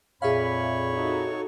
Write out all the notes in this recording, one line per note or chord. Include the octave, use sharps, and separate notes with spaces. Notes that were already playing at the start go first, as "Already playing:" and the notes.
F2 A#2 G#4 C#5 E5 F5 B5
D#4 F#4 A4